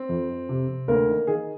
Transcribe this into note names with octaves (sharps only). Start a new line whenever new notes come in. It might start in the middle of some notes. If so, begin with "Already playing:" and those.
Already playing: C4
F2
F2
C3
C3
D2 A#3 A#4
D#3
D#3 G#4